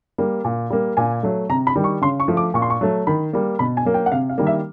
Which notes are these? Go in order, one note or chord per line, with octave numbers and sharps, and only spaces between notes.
G3 A#3
A#2
G3 A#3
A#2 G#5
F#3 A3
C3 A#5
B5
D#3 G3
C#6
C#3 C6
C#6
F3 A3
D6
A#2 C#6
C6
C#6
F#3 A3
D#3 B5
G3 A#3
B2 B5
G#5
F#3 A#3
G5
F#5
C3 F5
F5
D#3 G3 A#3
E5